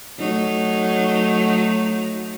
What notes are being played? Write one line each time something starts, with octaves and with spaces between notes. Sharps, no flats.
F#3 A3 D#4